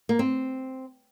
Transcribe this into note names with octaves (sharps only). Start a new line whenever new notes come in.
A#3
C4